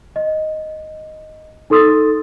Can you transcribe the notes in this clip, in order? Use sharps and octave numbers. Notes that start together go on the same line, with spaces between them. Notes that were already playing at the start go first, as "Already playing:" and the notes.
D#5
D#4 A4 C6 D#6 E6 A6